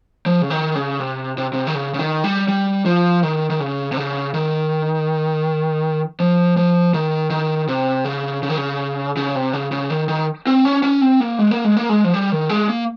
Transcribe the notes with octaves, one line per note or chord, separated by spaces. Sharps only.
F3
C#3
D#3
C#3
C3
C3
C3
D#3
C#3
C#3
D#3
G3
G3
F3
D#3
D#3
C#3
C3
C#3
D#3
F3
F3
D#3
D#3
C3
C#3
C#3
D#3
C#3
C#3
C3
C#3
C#3
D#3
D#3
C4
C#4
C#4
C4
A#3
G#3
A#3
G#3
A#3
G#3
F3
G3
D#3
G#3
A#3